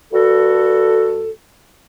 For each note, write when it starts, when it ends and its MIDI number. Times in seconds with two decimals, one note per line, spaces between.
0.13 1.30 43
0.13 1.30 66
0.13 1.30 69